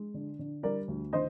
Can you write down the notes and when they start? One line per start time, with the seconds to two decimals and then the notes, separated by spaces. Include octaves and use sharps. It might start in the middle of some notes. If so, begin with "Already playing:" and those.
Already playing: G#3
0.14 D3
0.39 D3
0.63 G3 A#4 D5
0.88 D2
1.13 D#3 C5 D#5